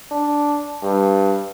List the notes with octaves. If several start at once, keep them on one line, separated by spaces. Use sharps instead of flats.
D4
G2